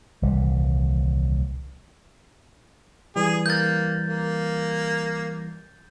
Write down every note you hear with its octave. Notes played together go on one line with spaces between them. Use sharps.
D#1 C2 E3 G3
E3 G3 G#4
A#3 G6 A6
A#3